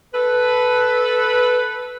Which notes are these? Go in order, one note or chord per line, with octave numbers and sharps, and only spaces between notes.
A4 B4